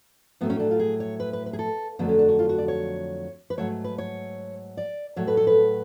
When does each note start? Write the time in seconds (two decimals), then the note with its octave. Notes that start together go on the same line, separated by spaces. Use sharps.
0.41 A2 F#3 A3 B3
0.50 C#4
0.60 D4
0.71 F4
0.79 G#4
1.00 C#5
1.20 B4
1.33 B4
1.46 B4
1.53 G#4
1.59 A4
1.99 F2 D3 F#3 A3 B3
2.09 C#4
2.19 D4
2.28 F#4
2.39 F4
2.49 F#4
2.58 D5
2.68 C#5
3.50 B4
3.57 G#2 F#3 A3 C#5
3.84 B4
3.98 C#5
4.77 D5
5.16 A2 F#3 A3 C#5
5.27 B4
5.37 A4
5.47 B4